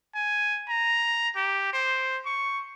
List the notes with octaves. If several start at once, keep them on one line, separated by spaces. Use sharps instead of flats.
G#5
A#5
G4
C5
C#6